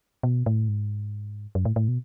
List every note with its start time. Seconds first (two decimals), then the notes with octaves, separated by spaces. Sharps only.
0.23 B2
0.46 A2
0.68 G#2
1.55 F#2
1.65 A2
1.76 A2
1.88 B2